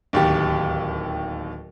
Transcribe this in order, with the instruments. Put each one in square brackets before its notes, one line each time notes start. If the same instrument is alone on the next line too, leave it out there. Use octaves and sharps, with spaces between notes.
[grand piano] D1 D#2 G4